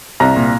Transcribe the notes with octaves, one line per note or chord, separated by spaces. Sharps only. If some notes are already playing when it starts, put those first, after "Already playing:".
C2 A#5
A#2